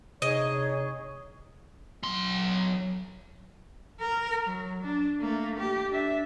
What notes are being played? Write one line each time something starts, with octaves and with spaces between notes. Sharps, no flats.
C3 D4 D#4 G#4 C#5 D#5
F#3 C6
A#4
F#3
D4
A3 A#3
G4
D4 E5